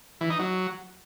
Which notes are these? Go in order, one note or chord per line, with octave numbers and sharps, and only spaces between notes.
E3
D#4
F#3